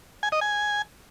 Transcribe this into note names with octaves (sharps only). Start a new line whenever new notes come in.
G#5
D#5
G#5